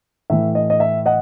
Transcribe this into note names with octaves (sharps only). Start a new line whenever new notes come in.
A2 E3 A3 E5
D#5
D#5
E5
D#5 F#5